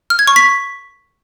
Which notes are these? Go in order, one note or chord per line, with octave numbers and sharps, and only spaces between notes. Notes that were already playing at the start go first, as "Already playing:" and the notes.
F6
G#6
C#6
B6